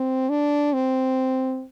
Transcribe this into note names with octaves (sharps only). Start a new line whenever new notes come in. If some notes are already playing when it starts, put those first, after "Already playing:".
Already playing: C4
D4
C4